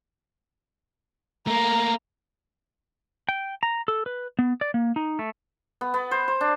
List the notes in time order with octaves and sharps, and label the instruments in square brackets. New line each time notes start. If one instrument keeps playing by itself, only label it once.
[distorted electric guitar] A3 A#3 [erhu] A#5
[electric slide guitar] G5
A#5
A4
B4
B3
D5
A#3
D#4
A3
[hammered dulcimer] B3
B3
C5
C5
D4